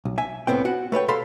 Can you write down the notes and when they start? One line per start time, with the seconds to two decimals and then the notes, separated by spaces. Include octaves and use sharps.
0.05 B1
0.18 E5 G#5
0.47 C2 A2 B3 C4 G5
0.65 F#4 F#5
0.92 A3 B4 C#5 G5
1.08 C3 A4 F5 B5 C6